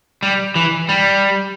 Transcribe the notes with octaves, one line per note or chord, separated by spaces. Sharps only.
G3
E3
G3